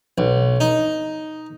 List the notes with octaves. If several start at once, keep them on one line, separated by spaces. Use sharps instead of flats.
B1
D#4